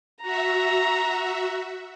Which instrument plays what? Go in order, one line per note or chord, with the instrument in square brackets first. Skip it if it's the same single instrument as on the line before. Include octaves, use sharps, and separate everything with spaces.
[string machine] F#4 E5 [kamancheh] A#5